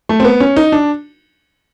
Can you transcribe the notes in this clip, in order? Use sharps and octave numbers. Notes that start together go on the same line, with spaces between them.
A3
C4
B3
C#4
D#4
D4